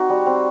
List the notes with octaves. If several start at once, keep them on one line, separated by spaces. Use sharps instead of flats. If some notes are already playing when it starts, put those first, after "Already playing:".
Already playing: C4 D#4 F#4
G3
C4